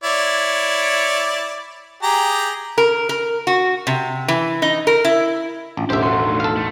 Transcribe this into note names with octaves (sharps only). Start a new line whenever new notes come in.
E4 C#5 D5
G4 G#4 A#5
A#4
A#4
F#4
C3
E3
D#4
A#4
E4
A1 C#4 D4 F4
E1 A1 G4 C5 E5
D3 F#3 C6
A3 D#4
A4 F5
A3